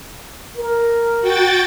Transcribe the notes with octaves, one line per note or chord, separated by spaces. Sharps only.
A#4
F#4 G5 A6